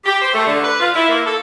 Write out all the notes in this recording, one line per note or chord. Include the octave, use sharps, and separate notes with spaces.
G4
C5
A3
D3
B4
F4
E4
A#3
A4